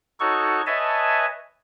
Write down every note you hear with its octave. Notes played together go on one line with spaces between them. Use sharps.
D#4 F#4 A4 C#5 C#6
B4 C#5 D#5 E5 G#5 A5